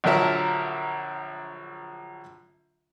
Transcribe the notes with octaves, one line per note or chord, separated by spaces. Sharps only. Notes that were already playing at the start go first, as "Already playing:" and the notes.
A#1 D3 F#3 A#4 E5 A5